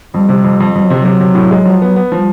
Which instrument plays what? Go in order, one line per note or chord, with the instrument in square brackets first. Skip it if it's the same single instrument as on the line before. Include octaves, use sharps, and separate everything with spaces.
[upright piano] F2 [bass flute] G3
[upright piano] C3
F2
F2
[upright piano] F2 [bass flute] G3
[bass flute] F#3
[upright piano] C3 [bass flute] F3
[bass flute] F#3
[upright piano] C3
C3
A2
G#3
F3
B3
B3
[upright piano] F3 [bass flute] G3